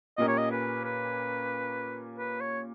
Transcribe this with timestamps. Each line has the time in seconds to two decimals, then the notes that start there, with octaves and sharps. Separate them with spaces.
0.17 A#2 A#3 C#4 G4 A#4 D#5
0.28 C#5
0.37 D#5
0.51 B4
0.84 B4
2.18 B4
2.41 C#5